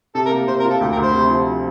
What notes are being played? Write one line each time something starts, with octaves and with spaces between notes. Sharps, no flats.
C3 A4
A#4
A#3
C3 C5
A#4
F4
A4
D2 G4
A#4
D2 C5
C3
F3